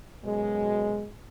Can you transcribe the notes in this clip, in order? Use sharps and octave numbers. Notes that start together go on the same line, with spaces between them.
F#2 B2 G#3